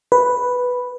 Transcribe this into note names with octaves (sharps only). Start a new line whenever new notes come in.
B4